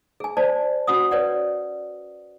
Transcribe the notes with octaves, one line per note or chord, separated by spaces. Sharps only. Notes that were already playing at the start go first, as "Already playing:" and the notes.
G#4 G#5
C5 D5 A5
C#4 F#4 F#5 D#6
B4 C#5 D5 F#5